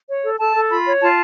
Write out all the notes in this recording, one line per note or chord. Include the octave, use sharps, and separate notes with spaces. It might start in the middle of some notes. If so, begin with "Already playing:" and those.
C#5
A4
A4 A5
A4
F4 B5
C#5
F4 A5